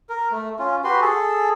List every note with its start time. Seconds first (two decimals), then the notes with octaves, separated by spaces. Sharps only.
0.09 A#4
0.31 A3
0.59 C#4 F4
0.84 F#4 G4 B4 C6
1.01 G#4 A4